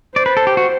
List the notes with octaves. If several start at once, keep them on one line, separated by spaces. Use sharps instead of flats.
C5 D5
B4
A4
G4
F#4